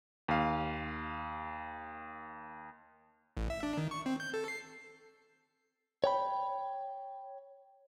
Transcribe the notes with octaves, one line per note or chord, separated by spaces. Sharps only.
D#2 F5
A1
E5
D4
D#3
C#6
C4
G6
A4
C7
C#5 G5 B5